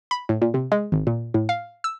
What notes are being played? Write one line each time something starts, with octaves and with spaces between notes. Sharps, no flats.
B5
A2
A#2
C3
G#3
G#1
A#2
A2
F5
E6